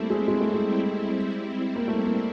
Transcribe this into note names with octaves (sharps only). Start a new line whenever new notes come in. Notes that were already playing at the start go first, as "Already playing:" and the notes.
Already playing: G3 A3 A#3 C4 E4
G#3
G#3
A3
G#3
A#3
A3
A#3